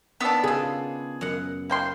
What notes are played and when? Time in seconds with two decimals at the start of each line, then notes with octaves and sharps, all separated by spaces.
0.20 D#3 B3 D4 E6
0.44 C#3 F4 G#4
1.21 F#2 F#5
1.70 A#3 G5 C6